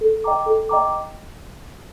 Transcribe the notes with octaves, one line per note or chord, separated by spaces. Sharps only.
A4
D#5 G5 A#5 D6
A4
D#5 G5 A#5 D6